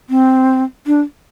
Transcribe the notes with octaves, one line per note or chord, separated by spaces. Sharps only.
C4
D4